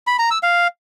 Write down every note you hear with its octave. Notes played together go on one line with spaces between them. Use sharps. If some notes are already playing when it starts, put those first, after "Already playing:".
B5
A#5
E6
F5